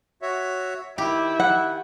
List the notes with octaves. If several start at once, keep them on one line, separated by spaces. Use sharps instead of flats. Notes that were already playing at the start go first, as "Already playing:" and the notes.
F#4 C#5 E5
D#3 E4 G4
F#5